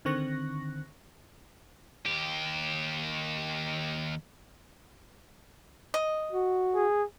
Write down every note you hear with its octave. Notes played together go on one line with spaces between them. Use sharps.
D3 D#3 C4 C#6 F#6 A#6
D#2 G4
D#5
F#4
G#4